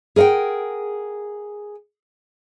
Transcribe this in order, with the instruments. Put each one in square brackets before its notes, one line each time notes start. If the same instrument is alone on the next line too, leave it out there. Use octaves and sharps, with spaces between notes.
[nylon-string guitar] G#4 A#4 D#5 F#5 G5